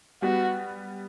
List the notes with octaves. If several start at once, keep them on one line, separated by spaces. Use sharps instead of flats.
G3 B3 F#4